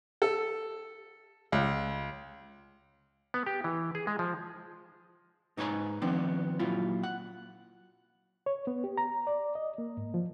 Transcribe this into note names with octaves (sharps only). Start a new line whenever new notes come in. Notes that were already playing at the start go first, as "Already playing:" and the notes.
A4
C#2
B3
G4
E3
G#4
G#3
F3
G#2 D#4 B4 C#5 G#5 A#5
D#3 F3 B3 C4 D4
A#2 F#3 E4 F4
F#5
C#5
B3
G4
A#5
D5
D#5
A#3
G#2
F3